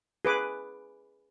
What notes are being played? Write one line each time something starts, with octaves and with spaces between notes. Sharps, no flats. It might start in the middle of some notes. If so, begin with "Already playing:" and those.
G#4 B4 D6